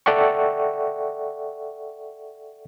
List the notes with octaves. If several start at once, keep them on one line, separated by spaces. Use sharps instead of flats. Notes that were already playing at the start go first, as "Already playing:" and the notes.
A4 D5 E5 F#5 G5 C#6